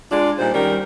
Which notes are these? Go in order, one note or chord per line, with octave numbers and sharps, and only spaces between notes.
G#3 D4 F4 D5
A#2 G3 D#4 C5
D#3 G3 C#4 A#4